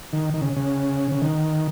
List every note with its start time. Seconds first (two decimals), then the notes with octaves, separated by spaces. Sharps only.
0.13 D#3
0.34 D#3
0.42 C#3
0.56 C#3
1.12 C#3
1.22 D#3